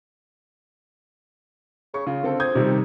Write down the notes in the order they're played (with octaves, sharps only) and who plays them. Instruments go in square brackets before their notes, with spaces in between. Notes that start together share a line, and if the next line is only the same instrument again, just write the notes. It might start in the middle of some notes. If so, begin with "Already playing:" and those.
[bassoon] C#3 [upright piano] C#6
[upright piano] C#3 [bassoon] F4
[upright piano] D3 C4 A4
[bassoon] C4 [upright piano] D#6 G6 G#6
[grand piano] C3 D#3 G3